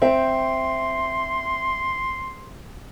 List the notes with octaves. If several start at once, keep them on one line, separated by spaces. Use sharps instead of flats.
C4 E5 G5 C6